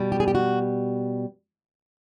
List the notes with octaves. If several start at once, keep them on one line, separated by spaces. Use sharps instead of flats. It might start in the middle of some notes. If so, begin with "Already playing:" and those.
Already playing: B2 G3
G4
G#4
G4
F#4